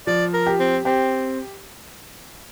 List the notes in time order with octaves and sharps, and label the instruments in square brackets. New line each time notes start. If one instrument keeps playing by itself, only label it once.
[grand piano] F3 [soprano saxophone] D5
[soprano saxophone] A#4
[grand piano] G4
[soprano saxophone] C4
[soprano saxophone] C4 [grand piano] G4